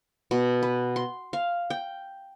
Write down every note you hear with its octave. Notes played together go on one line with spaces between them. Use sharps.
B2
B4
C6
F5
G5